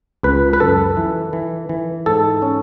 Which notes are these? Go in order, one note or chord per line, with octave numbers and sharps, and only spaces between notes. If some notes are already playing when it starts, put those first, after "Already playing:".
C#2 B4
B4
F#2 A4
E3
E3
E3
G#2 A4
C#4